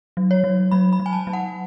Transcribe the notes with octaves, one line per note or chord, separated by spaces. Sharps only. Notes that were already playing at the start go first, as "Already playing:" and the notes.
F#3
C#5
F#3
F#3 B5
B5
F#3
G#5
A5
F#3
F#5